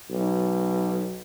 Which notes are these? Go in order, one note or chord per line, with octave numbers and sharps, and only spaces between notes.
B1